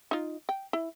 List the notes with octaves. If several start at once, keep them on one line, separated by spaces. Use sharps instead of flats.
D#4 F4
G5
E4